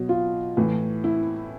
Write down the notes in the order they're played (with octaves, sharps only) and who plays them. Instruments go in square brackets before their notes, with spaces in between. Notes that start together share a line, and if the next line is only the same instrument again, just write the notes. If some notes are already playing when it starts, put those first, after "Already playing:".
Already playing: [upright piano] B2 F#3
F4
A2 E3
E4